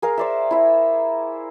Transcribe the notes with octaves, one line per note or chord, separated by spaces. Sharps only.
G#4 A#4 F5
C5 D5 E5
E4 E5